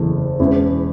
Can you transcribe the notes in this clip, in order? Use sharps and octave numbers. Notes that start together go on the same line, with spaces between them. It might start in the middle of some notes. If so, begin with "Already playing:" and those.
Already playing: F#1 E2 E3 A3
E1 E2 E3 C#4 E4